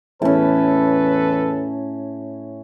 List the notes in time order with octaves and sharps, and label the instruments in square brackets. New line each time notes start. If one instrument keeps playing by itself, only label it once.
[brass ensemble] E2 A4 B4 [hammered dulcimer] A2 C#4